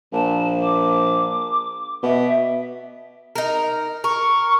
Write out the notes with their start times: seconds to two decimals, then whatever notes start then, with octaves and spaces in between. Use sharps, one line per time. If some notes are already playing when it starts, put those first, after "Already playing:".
0.13 A#1 A5
0.62 D6
2.03 B2 E5
3.35 D#4 A#4
4.04 A#4 C#6